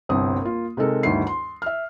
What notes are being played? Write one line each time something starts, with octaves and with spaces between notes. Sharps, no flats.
G1 C2 C4 D#6
A#3 F4
C3 G#3 D#4 A4 A#4
G1 D2 D#3 E4 C7
C6
E5 F6